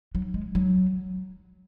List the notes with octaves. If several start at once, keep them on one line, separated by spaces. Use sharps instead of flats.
F#3
G#3
F#3